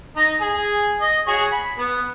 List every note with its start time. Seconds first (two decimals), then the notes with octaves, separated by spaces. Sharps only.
0.16 D#4 A#5
0.41 G#4
1.01 D#5
1.27 F#4 G#4 C#5
1.52 B5
1.78 B3